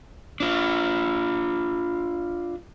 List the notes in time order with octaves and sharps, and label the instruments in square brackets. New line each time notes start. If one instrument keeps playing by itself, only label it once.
[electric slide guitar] D4 F4